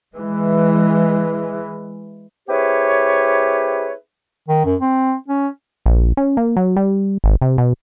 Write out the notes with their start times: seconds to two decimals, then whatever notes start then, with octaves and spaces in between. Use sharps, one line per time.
0.15 E3 G#3
2.49 C4 E4 G4 G#4 B4 C#5
4.49 D#3
4.65 F#2
4.81 C4
5.28 C#4
5.86 A#1
6.17 C#4
6.37 A#3
6.57 F#3
6.77 G3
7.24 G#1
7.42 C3
7.58 B2